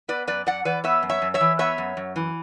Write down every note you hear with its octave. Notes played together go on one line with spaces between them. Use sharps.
B3 B4 D5
F#2 B4 D5
F#2 D5 F#5
E3 B4 D5
B3 C#5 E5
F#2
C#5 E5
F#2
C#5 E5
E3
B3 C#5 E5
F#2
F#2
E3